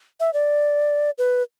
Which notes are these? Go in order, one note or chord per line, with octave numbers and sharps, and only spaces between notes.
E5
D5
B4